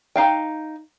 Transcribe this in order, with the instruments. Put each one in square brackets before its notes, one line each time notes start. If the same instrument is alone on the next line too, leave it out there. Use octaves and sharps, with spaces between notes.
[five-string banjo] D#4 F5 G5